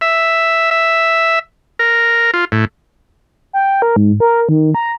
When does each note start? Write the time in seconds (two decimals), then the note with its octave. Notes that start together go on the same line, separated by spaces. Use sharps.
0.01 E5
0.71 E5
1.79 A#4
2.34 F4
2.52 A2
3.53 G5
3.82 A#4
3.96 G#2
4.20 A#4
4.49 D#3
4.75 A#5